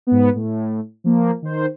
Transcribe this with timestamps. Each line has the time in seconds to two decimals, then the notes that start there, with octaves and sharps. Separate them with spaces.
0.07 G#2 B3
0.35 A2
1.04 F3 A#3
1.42 D#3 C5